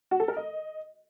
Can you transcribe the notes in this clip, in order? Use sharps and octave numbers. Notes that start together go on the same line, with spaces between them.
F#4
A4
A#4
D#5